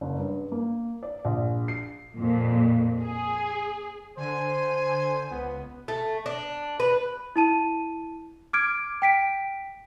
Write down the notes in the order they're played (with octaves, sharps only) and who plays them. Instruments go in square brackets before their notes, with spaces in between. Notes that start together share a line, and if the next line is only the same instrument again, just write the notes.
[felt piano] F#1
G2
A#3
D5
A#1
C7
[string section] F2 A#2
G#4
[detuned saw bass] D3 [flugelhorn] C5 [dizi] G#5
[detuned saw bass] C#2 [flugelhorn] B3
[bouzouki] A3
D4
B4
[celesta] E4 A5 D#7
D6 F6 G#6 D7
G5 B6 D7